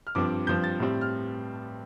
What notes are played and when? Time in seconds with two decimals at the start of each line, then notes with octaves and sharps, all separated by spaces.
0.07 F6
0.15 G2 F3 C4 D6
0.47 G2 F3 C4 G6
0.64 A6
0.80 A2 G3 C4
1.01 F6